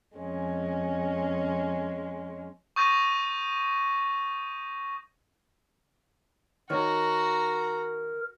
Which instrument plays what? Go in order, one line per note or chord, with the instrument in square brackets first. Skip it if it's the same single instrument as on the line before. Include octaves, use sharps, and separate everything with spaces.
[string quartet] F2 G#3 C#4
[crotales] C#6 D#6 G6 A6 A#6 D#7
[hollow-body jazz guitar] D#3 C#5 [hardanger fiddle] F#4 A#5 [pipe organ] A#4